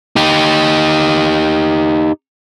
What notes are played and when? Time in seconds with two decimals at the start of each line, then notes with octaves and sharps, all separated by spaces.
0.16 D#4 G4